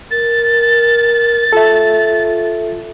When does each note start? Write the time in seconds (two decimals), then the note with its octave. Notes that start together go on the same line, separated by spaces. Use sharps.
0.11 A#4 A6
1.53 F4 A4 E5